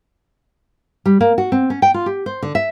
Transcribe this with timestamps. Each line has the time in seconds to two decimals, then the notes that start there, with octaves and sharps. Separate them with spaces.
1.06 G3
1.21 A#3
1.38 F#4
1.52 C4
1.70 C#4
1.82 G5
1.94 F4
2.06 G4
2.26 C5
2.43 D3
2.55 E5